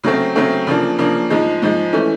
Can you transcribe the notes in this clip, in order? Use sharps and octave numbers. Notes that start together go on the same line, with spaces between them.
C#3 F#3 A3 C4
C#3 F#3 A3 C4
C#3 F3 A#3 D4
C#3 F3 A#3 D4
G#2 F3 G#3
G#2 F3 G#3
E3 A3 C#4